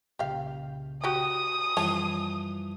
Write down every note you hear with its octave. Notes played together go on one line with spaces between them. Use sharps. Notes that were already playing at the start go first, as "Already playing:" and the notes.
C2 A#2 C#3 G4 F5
F#4 G4 G5 D#6
F#2 E3 F3 G3 G#4 C#5 A5